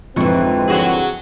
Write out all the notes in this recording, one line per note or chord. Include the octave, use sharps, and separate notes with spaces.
F2 G#2 D3 E3 C4 C#6
F#3 F#4 G#4